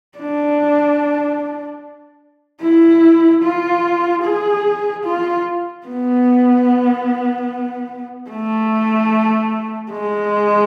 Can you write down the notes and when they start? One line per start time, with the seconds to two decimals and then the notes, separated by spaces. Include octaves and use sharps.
0.18 D4
2.62 E4
3.43 F4
4.24 G#4
5.05 F4
5.86 B3
8.30 A3
9.92 G#3